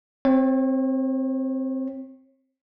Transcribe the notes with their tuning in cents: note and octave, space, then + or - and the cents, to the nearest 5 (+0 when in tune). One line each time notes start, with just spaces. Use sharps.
C4 +0 C#5 -35